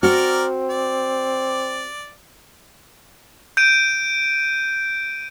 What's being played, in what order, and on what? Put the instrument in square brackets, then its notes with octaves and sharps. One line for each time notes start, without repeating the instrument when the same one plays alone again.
[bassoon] C4 [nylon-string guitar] F#4 [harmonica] A#4 D5 F6
[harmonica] D5
[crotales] G6 D7 D#7